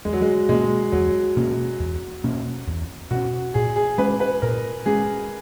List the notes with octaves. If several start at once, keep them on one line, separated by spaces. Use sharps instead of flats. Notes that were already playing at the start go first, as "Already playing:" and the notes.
E2 G#3
F#3
G#3
B2 G#3 A#3 C#4
E2 F#3
B2 A#3 C#4
E2
B2 A#3 C#4
E2
B2 A#3 C#4 F#4
A#2 G#4
G#4
G#3 C#4 B4
B4
A#2 A#4
G#3 C#4 G#4